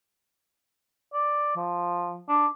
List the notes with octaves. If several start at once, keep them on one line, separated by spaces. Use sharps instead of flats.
D5
F3
D4